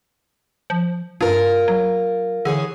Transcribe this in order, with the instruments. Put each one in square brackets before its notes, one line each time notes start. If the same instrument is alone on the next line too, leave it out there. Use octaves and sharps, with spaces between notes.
[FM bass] F3
[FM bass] G2 [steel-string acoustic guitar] F4 A#4
[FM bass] F#3
[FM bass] D3 [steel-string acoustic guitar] E3 G#4 C#5